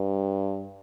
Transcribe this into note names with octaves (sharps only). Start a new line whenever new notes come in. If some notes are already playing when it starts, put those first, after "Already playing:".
Already playing: G2